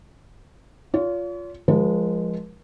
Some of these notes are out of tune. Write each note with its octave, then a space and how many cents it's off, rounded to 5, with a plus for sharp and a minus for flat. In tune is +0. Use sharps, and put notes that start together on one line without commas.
F4 +0 C#5 +45
F3 +0 G#3 -5 A#4 +40